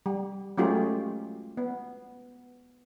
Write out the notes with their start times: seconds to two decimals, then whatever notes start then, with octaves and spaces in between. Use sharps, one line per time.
0.06 G3
0.58 F#3 G#3 A3 C#4 F4 G4
1.57 B3